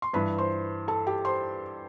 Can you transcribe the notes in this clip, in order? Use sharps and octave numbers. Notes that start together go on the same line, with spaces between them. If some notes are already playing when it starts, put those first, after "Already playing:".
C6
G2 E3 B4 B5
C5 C6
A4 A5
G4 G5
C5 C6